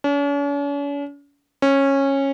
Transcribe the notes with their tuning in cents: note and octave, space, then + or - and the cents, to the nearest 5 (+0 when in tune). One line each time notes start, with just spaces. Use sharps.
C#4 +45
C#4 -15